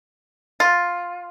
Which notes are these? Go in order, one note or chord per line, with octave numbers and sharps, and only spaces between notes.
F4